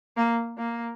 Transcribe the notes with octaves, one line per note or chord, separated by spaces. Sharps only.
A#3
A#3